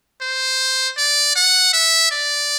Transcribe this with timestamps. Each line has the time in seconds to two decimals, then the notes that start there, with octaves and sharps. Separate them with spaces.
0.22 C5
0.97 D5
1.36 F#5
1.73 E5
2.11 D5